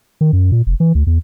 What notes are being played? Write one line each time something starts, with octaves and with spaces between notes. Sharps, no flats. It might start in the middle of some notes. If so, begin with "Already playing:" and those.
D#3
F#2
A#2
F1
E3
D2
E2